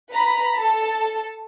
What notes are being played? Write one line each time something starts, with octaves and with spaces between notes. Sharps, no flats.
B4 A#5 B5
A4 A5